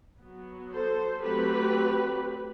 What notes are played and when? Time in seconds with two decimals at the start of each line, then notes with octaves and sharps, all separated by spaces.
0.20 F#3 B3
0.72 A4 C5
1.23 F#3 A3 C4 G4 B4